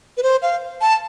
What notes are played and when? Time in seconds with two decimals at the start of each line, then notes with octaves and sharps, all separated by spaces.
0.17 B4
0.23 C5
0.42 F5
0.81 A5